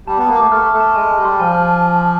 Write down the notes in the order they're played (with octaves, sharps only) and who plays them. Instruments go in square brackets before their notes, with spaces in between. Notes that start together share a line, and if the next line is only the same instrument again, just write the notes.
[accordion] G3 [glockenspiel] A5
[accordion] B3 [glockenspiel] A5
[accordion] A#3
[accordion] A3 [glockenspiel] D6
[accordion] A3 [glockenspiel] F6
[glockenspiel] A5
[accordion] A3
[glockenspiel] A5
[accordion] G#3 [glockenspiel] G#5
[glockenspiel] G#5
[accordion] G3
[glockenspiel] C6
[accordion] F3 [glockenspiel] G#5
[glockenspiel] F6